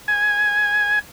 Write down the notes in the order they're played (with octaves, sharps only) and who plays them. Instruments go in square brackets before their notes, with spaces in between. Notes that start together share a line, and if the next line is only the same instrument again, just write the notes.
[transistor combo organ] G#5